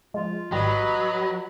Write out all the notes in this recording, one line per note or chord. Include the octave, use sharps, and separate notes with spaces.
F3 G#3 F4
G#1 F#3 G3 B4 D#5 B5